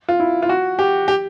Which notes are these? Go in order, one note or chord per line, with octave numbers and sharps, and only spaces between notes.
F4
E4
F4
F#4
G4
G4